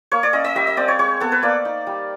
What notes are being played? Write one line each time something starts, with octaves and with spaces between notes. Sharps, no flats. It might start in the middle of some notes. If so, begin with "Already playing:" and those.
A#3 C#5
D5
C#4 D#5
D#5
G3 E5
D#5
C4 D5
C#5
G#3 C#5
B3 A4
B4
A#3 D5
D#4
G3